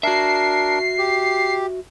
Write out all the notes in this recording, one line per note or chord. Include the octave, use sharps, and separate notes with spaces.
D4 F#4 A#4 E5 C7
G4